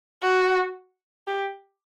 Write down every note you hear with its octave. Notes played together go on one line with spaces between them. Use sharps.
F#4
G4